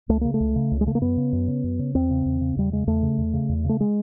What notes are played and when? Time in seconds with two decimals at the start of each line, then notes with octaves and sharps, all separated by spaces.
0.09 C#2 A3
0.21 C#3 A#3
0.34 A3
0.40 C#2
0.56 C#3
0.71 C#2
0.81 G#3
0.87 C#3 A3
0.95 A#3
1.01 F#2 B3
1.17 C#3
1.33 F#2
1.48 C#3
1.64 F#2
1.79 C#3
1.95 E2 C4
2.10 C#3
2.26 E2
2.41 C#3
2.56 E2 G3
2.72 C#3 G#3
2.87 E2 A3
3.02 C#3
3.18 E2
3.33 C#3
3.49 E2
3.64 C#3
3.69 A3
3.80 G#3